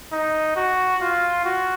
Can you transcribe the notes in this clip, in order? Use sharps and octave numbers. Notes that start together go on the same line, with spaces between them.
D#4
F#4
F4
F#4